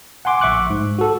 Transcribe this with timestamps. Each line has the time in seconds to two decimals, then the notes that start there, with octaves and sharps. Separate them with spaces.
0.25 F#5 G#5 C6 D6
0.41 A#1 E5 C#6 D6 F#6
0.70 G#2
0.99 F#4 A4